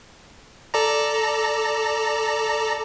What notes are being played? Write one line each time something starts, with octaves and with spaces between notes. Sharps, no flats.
A4 D5 A#5